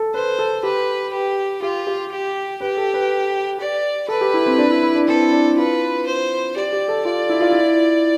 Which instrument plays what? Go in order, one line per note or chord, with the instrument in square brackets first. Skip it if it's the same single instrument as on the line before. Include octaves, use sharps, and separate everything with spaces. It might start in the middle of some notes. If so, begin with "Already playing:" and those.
Already playing: [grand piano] A4
[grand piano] B4 [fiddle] C5
[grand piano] A4
[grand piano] G4 [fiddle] B4
[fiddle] G4
[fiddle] F4 [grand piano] G4
[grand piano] G4
[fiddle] G4
[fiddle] G4 [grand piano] B4
[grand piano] A4
B4
[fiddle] D5
[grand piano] A4 [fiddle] B4
[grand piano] G4
E4
C4
D4
E4
E4
D4
[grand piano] C4 [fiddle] A4
[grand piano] D4
[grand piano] F4 [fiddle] B4
[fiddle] C5
[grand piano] G4 [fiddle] D5
[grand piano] G4
A4
[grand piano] F4 [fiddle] D5
[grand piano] E4
F4
E4